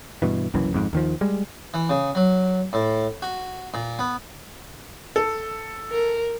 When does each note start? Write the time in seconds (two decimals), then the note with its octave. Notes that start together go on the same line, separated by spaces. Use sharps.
0.22 G2 B2 E3
0.54 F#1 C2 F#2 E3
0.73 G#1 F2 G#2
0.93 D#2 D#3 F3
1.21 G3 G#3
1.74 E3
1.89 C#3
2.15 F#3
2.73 A2
3.22 F#4
3.74 A#2
3.99 B3
5.16 A4
5.91 A#4